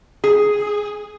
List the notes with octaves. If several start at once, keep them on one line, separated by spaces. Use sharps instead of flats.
G#4